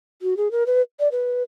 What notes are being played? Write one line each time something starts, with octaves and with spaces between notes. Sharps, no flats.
F#4
G#4
A#4
B4
D5
B4